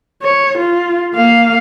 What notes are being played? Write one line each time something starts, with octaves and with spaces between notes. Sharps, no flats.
C#5
F4
A#3 F5